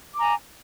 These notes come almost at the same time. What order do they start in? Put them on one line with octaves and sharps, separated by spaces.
D6 A#5 G#5